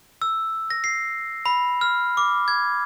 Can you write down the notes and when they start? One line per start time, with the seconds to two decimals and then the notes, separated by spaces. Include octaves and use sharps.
0.22 E6
0.70 A#6
0.84 C7
1.46 B5
1.81 F6
2.17 D6
2.48 G#6